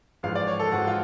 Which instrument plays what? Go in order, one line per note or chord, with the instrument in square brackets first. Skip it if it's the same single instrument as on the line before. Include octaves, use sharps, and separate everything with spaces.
[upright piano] A1 G#2 F3 F5
D5
C#5
A4
A1 G#2 F3 F#4
F4